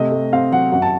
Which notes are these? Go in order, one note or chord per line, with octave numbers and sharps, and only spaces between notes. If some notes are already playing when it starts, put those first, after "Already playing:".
Already playing: C3 A3 D#5
A3
C4 F5
F#3 F#5
F#2 F#5
A5